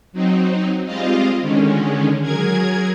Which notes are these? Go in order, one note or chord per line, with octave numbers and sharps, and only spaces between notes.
F#3 C4 D#4
G3 G#3 C4 F4 D#5 F5
D3 D#3 G#3 C#4
F#3 G#4 A#4 G#6